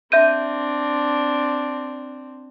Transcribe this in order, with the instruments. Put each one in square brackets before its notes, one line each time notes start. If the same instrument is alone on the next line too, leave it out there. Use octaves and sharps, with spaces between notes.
[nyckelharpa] C4 D4 [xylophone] E5 G6 D#7